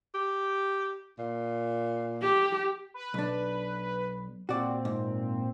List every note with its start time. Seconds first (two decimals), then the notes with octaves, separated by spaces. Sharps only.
0.15 G4
1.19 A#2
2.23 G4
2.94 B4
3.14 B1 D4
4.49 A#2 C4 F#4 D5
4.85 G#2